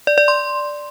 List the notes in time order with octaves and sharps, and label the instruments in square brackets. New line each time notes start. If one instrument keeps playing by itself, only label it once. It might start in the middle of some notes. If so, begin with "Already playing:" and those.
[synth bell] D5
D5
C6